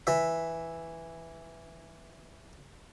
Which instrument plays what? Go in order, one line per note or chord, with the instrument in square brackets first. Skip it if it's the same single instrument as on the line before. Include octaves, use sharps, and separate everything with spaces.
[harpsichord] E3 E5